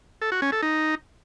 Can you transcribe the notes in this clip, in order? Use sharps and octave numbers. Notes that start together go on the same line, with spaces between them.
A4
F#4
C#4
A4
D#4